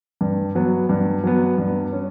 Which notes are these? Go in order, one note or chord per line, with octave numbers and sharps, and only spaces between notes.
G2
F#3 B3
G2
F#3 B3
G2
C#4